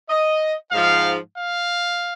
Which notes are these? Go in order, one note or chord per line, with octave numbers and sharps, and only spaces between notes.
D#5
G#2 F3 F5
F5